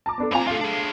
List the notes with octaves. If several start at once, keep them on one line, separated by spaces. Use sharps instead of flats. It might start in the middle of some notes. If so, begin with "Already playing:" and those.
A5 A#5 D6
B3 D4 A4
A2 C4 F4 G#5 A#5
D3 A3 F4 F5
D4 G#4